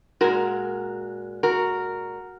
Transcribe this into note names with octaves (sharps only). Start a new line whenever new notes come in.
A#2 G#3 F#4 A#4
F#4 A#4